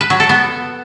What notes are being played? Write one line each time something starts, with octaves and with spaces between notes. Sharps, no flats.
B4
F#3
A4
B3